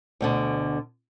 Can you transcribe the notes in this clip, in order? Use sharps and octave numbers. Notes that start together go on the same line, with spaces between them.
D2 B2 D3